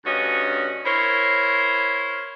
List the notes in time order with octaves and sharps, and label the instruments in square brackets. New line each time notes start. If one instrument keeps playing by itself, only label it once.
[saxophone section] D2 G2 C#4 F#4 D#5
E4 A#4 C5 C#5